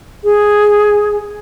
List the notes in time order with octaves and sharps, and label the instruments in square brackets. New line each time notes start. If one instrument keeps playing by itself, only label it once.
[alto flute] G#4